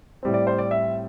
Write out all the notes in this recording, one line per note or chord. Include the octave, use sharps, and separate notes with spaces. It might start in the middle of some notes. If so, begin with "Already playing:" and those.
A2 G3 C4
D5
C5
D5
E5